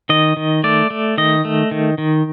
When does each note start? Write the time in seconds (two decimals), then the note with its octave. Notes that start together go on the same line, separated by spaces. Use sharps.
0.09 D#3 D#5
0.37 D#3
0.64 A3 D5
0.90 A3
1.18 D#3 D#5
1.45 A3
1.71 D#3
1.98 D#3